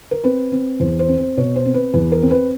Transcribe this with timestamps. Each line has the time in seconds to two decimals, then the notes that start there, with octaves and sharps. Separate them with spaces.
0.11 A#4
0.24 C4 B4
0.52 C4
0.80 E2 C5
0.99 C5
1.09 C4
1.18 C5
1.37 B2 C#5
1.56 C5
1.65 C4
1.74 B4
1.94 E2 B4
2.12 A#4
2.23 C4
2.31 B4